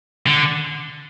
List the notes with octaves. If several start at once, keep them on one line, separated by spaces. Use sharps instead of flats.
D3